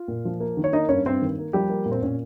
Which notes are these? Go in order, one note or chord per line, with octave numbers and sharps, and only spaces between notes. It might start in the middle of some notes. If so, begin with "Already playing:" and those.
Already playing: F4
A#2
F3
A#3
D#3
C#5
A#3 D#4 D#5
G2 C#4 C#5
G2 C4 C5
D#3
A#3
F3 G3 G4
A#3
A#2
C4
A#2 C#4